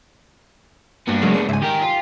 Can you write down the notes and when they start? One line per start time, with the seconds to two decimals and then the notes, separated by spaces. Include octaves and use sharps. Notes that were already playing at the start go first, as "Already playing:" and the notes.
1.08 G2 A#3 B3 D4 F#4
1.22 C#3 F#3 G#3 A3 G#4 A#4
1.34 D5
1.49 C#2 G#2 E5 G#5
1.62 D#3 G4 A#4
1.82 F4